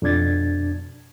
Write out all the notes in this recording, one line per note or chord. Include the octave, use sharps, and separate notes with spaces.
F2 B2 D4 G#6 A6